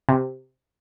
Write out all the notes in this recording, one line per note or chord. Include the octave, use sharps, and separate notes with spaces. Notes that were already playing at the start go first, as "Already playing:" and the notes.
C3